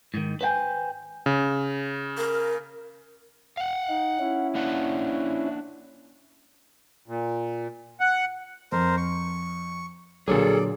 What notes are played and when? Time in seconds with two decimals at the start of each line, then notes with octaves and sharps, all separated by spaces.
0.14 G#2 D#3
0.41 B4 C5 F5 G5 G#5
1.26 C#3
2.18 A#4
3.57 F5 F#5
3.89 D#4
4.19 C#4 E4
4.55 A#3 D4 F#5
7.08 A#2
8.00 F#5
8.72 F2 A#4 C5
8.97 C#6
10.28 A#2 D3 F#3 G#4 A4 D5